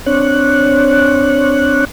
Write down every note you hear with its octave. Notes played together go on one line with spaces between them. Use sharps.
C4 D4 C#5 F#6